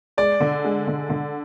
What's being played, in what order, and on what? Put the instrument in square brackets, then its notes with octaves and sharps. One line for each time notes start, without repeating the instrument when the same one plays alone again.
[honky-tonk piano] G#3 [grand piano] D5
[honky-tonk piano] D3
G#3
D3
D3